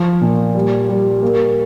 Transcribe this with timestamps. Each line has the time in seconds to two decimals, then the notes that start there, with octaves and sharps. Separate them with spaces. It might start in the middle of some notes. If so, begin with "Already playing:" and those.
Already playing: F3
0.21 A#2
0.55 G3
0.89 G3
1.22 A#3